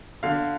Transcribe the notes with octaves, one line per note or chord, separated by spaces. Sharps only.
D3 F5